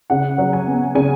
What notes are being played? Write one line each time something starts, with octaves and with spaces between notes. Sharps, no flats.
C#3 F#5
F#3
G#5
B3
C#3 G#5